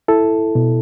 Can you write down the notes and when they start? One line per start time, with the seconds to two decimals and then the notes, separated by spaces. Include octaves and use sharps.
0.08 E4 A4
0.55 B2